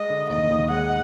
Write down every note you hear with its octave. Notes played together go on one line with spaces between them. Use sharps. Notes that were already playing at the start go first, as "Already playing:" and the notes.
Already playing: G#3 D#5
D3
D#2 D#5
D#2
G#3 F#5